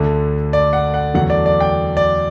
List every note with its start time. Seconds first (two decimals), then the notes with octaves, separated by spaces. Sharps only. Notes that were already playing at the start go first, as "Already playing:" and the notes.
Already playing: D2 D3 A3
0.53 D5
0.73 F#5
0.94 F#5
1.14 E2 D3 F#3 A3 F#5
1.30 D5
1.46 D5
1.61 G5
1.97 D5